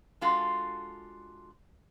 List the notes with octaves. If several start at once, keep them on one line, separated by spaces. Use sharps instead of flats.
G#3 D4 F4 F#4 A4